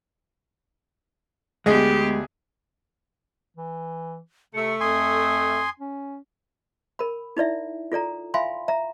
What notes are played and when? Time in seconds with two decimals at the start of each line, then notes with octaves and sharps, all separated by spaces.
1.66 D2 G#3 B3 G4 G#4 D#5
3.57 E3
4.54 C3 A3 C#7
4.80 F2 G#5 C6 D#6
5.80 C#4
6.99 A#4 B5
7.37 D#4 E4 D5 E5
7.92 F4 A4 D5 A#5
8.34 E5 F5 G#5 B5 C6
8.68 E5 A#5